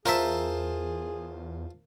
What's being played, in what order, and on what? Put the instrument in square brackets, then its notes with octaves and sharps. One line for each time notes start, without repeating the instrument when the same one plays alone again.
[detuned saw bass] E2 [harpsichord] F4 C5 A5 [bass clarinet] G#4 [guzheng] A#4 E5